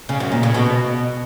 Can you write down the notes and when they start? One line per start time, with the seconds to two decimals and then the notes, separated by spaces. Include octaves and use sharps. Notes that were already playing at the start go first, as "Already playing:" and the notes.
0.09 C#3
0.20 F#2
0.32 A#2
0.43 C#3
0.54 B2